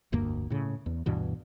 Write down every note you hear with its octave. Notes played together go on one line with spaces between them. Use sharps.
F1 D2 G2 A#3
A2 C#3
E2
D2 G2 B2 E3